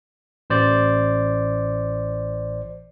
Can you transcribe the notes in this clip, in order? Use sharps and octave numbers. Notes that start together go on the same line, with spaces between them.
A1 C5 D5